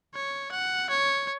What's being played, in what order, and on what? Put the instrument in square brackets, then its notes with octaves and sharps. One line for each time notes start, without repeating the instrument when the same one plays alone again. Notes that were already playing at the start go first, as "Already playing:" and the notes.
[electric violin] C#5
F#5
C#5